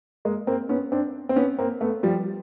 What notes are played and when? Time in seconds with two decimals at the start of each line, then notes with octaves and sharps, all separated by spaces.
0.25 G#3 A#3
0.47 A#3 C4
0.69 B3 C#4
0.92 C4 D4
1.29 C4
1.36 B3 C#4
1.58 A#3 C4
1.81 A3 B3
2.03 F3 G3